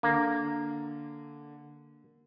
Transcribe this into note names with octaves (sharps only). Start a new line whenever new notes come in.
D3 A#3